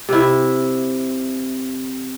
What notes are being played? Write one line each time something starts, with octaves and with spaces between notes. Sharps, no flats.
C3 E4